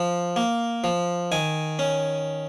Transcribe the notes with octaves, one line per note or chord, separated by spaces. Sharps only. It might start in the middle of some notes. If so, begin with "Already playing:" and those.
Already playing: F3
A#3
F3
D#3 G#5
C#4